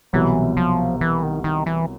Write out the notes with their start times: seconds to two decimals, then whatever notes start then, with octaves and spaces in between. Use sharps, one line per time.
0.13 C2 B2 E3 F#3
0.57 F3
1.01 E3
1.23 D#3
1.44 D#3
1.66 E3